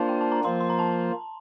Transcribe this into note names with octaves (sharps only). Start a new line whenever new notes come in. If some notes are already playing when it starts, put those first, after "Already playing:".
Already playing: A#3 D4 F4 C5 F5 A5
G5
A5
A#5
F3 A#3 F4 C5 C6
C6
A#5
A5